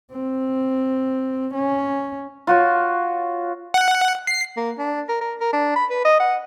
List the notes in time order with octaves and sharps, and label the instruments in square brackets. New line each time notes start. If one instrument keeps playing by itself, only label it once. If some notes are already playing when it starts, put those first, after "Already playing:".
[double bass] C4
C#4
[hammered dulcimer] F4 F#4 C#5
[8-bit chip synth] F#5
C7
[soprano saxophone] A#3
D4
A#4
A#4
A#4
D4
B5
B4
D#5
F#5